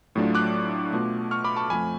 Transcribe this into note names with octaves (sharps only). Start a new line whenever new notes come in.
A2 F#3 A3 D4 F4
D6 F#6
B2 A3 F4
C#6 F6
B5 D6
A5 C#6
F2 F3 A3 G#5 B5